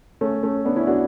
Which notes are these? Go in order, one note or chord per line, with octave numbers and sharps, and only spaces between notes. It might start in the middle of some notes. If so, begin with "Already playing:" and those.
A3 C#4
A3 C#4
B3 D4
C#4 E4
D4 F#4